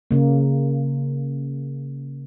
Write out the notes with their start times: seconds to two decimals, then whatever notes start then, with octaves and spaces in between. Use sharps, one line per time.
0.11 C#3 A#3